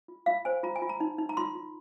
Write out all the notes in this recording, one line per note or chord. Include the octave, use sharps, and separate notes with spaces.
F4
F4 F5
C5 G#5
F4 A#5
G#5
F4
A#5
D#4
D#4
A#5
F4 C6
F4